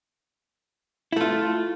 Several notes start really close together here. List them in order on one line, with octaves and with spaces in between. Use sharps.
E4 A3 F4